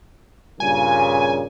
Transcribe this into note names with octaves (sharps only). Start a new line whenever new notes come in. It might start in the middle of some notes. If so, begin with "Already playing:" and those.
G2 A#2 C#3 G#5